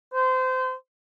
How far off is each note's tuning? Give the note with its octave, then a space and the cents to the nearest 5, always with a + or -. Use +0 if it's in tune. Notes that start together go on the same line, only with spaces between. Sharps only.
C5 -25